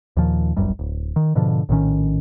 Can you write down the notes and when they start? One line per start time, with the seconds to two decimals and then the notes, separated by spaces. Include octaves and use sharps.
0.17 D#2 A#2 D#3 F3
0.57 D1 G1 F#2 G3
0.79 D1
1.16 D#3
1.35 G#2 B2 D3 F3
1.69 A#1 A2 D#3 C#4